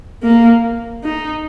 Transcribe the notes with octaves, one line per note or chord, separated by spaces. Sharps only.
A#3
D#4